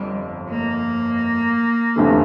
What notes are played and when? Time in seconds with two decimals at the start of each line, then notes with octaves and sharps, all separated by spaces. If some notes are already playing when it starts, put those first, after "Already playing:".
Already playing: G1 F2 G3
0.48 A#3
1.96 F1 E2 D3 A3